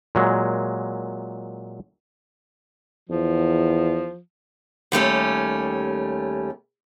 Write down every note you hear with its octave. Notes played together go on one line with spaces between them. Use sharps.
A#2 F#3 G#3
E2 F3
D#2 G3 A3 C#4